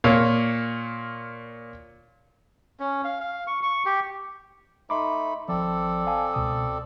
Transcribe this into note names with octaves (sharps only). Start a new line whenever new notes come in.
A#2 C#5 F5
C#4
F5
F5
C#6
C#6
G4
A3 D#4 B5 C6 D6
G#1 F3 C4 A4 D5
F5 G#5 A5
C#2 B2 D#6